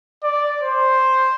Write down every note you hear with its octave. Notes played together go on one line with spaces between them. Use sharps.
D5
C5